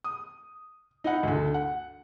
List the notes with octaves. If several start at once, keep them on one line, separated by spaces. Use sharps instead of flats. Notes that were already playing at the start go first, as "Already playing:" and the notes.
D#6
D#4 E4 F#5
D2 D3
F#5